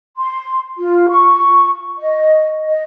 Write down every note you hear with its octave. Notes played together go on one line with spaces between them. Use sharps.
C6
F4
C#6
D#5
D#5